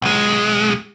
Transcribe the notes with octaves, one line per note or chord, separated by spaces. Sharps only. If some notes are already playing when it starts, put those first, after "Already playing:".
B1 G#3